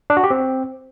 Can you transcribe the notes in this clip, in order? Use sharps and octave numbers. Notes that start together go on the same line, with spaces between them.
D4
F#4
G4
C4